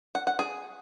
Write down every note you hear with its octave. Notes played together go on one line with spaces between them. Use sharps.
F#5
F#5
G#4